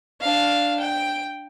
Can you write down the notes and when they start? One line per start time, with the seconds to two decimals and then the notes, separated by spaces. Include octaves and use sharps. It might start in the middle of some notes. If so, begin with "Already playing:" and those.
0.21 D4 F5
0.80 G5